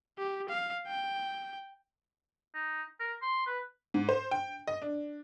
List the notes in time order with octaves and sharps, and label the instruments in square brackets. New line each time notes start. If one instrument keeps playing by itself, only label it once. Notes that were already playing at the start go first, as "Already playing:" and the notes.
[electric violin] G4
F5
G5
[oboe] D#4
A#4
C6
B4
[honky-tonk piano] G#2
C5
G5
D#5
D4